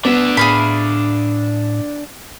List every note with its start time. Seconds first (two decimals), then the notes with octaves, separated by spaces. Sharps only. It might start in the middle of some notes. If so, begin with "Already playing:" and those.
0.05 B3 D4 E5
0.37 A2 G#4 F5 B5